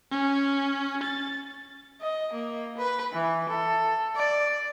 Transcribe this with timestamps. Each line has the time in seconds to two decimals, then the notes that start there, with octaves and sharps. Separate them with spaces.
0.12 C#4
1.03 A6
2.01 D#5
2.33 A#3
2.78 B4
3.13 E3
3.49 A4
4.16 D5